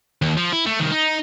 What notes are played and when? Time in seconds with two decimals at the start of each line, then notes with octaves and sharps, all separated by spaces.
0.22 D#2
0.37 F3
0.52 E4
0.66 A3
0.80 C2 D#3
0.92 D#4